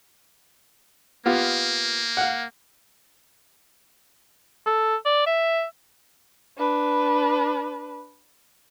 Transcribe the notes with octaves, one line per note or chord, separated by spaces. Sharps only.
A#3 B3 F4 G4
F5 F#5
A4
D5
E5
D4 B4